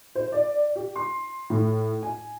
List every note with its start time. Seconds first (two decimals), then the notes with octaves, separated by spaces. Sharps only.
0.15 C5
0.32 D5
0.76 G4
0.96 C6
1.50 A2
2.03 G#5